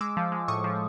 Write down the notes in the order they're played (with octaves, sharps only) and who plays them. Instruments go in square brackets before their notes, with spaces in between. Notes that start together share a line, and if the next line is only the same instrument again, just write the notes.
[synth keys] G#3 D6 E6
F3
G#3
A2 C#6 D#6
F3